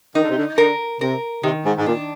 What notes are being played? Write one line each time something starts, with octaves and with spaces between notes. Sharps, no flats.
D#3 D#4
D3
C3
D3
D3 A#4
C3 A#4
C3 D#3
G#2
G#2
A#2 D4